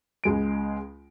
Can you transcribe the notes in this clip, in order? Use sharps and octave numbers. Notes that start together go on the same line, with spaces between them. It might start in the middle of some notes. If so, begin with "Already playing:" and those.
C#2 G#3 D7